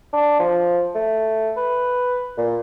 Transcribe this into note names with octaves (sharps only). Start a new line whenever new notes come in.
D4
F3
A3
B4
A#2